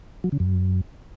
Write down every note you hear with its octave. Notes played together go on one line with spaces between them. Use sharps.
F#3
C#3
F#2